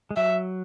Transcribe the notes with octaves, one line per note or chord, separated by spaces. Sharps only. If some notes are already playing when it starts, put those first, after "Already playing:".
G#3
F#3 E5